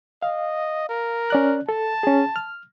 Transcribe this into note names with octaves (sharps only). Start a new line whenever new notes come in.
D#5 F5
A#4
C#4 D5 F#6
A4 A5
C#4 G#4
F6